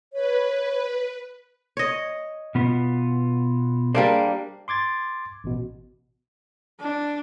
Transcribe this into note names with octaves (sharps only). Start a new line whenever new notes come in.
B4 C#5
C#5 D#5
B2 B3 F4
G3 A#3 D4 G#4 C5 D5
C6 D6 G#6 A6
A1 B2
D4